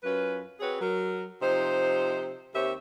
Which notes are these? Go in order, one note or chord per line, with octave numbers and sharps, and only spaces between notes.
F#2 C#4 F4 B4
C4 F#4 G#4 B4 C#5
F#3 A#4
C3 F3 D#4 C5
D#2 C4 G4 C#5 E5